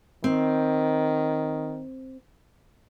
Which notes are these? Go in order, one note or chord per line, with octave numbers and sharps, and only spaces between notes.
D#3 C4